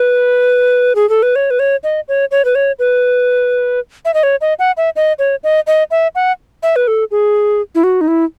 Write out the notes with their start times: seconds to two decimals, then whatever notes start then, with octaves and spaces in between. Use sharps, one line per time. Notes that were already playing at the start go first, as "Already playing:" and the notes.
Already playing: B4
0.95 G#4
1.09 A4
1.23 B4
1.36 C#5
1.51 B4
1.59 C#5
1.84 D#5
2.08 C#5
2.31 C#5
2.45 B4
2.55 C#5
2.79 B4
4.05 E5
4.14 D#5
4.23 C#5
4.41 D#5
4.59 F#5
4.77 E5
4.96 D#5
5.19 C#5
5.44 D#5
5.67 D#5
5.91 E5
6.15 F#5
6.63 E5
6.76 B4
6.88 A4
7.11 G#4
7.75 E4
7.84 F#4
8.01 D#4
8.08 E4